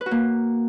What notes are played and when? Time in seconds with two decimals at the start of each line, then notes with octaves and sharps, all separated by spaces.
0.01 B4
0.06 F#4
0.11 A#3